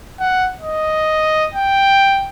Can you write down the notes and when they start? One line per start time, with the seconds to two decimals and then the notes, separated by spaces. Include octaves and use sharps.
0.20 F#5
0.61 D#5
1.54 G5